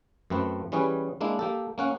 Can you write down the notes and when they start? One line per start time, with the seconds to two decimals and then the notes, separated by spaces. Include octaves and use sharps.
0.30 F#2 A3 C4 B4
0.72 E3 G3 C#4 G#4 B4
1.21 G#3 A#3 D4 E4
1.39 A#3 G4 A4
1.78 A#3 C#4 F#5